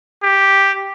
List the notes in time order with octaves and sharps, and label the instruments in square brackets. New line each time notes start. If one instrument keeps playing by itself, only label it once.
[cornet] G4